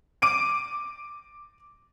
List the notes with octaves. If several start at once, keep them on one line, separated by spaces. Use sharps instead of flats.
D6 D7 D#7